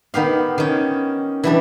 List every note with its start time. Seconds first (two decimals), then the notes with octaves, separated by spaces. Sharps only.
0.14 D#3 B3 G4 F5
0.58 D#3 C#4
1.44 E3 G3 D4